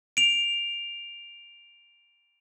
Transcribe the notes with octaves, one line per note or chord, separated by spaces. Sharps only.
D7 F7